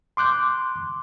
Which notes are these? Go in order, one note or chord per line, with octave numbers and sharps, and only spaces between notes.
C6 D6 F#6 G6